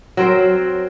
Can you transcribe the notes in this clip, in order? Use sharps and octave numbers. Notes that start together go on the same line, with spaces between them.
F#3 C4 A#4 C5